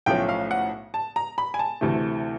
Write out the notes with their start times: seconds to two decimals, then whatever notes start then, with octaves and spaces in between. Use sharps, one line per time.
0.06 B1 A2 F3 A3 C#4 G5
0.29 F5
0.51 F#5
0.94 A5
1.16 A#5
1.38 B5
1.54 G#5
1.59 A5
1.81 D2 C3 E3 A3